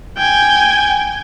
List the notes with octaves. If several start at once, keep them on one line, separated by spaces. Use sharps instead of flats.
G5 G#5